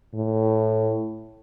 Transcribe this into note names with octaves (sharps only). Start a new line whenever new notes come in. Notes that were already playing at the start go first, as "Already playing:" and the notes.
A2